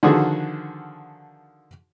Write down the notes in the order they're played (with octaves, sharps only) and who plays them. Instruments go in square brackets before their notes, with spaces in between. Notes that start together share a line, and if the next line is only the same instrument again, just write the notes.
[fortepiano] D3 D#3 F3 F#4 G#4 A4